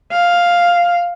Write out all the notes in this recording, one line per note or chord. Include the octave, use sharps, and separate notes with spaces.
F5